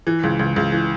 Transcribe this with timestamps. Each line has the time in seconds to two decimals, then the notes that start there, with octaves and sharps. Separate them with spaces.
0.07 E3
0.23 C#2
0.39 C#2
0.56 C#2
0.72 E3